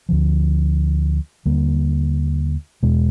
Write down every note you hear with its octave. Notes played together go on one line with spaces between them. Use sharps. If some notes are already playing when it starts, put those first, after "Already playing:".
D2 D3 F3
D#2 D3 G3 A#3
E2 B2 G#3